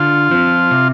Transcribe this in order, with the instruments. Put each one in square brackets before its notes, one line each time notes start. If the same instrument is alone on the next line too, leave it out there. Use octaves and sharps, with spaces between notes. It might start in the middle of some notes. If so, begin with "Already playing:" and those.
Already playing: [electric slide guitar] D3 [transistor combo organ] F4
[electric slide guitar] F3 C4
C3